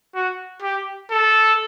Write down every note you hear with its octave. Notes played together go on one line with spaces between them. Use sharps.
F#4
G4
A4